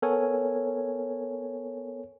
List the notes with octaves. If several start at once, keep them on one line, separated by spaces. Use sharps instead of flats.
B3 A4 A#4 C#5 G#5